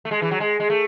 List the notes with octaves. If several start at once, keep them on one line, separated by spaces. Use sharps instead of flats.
A3
G#3
E3
F#3
G#3
G#3
A3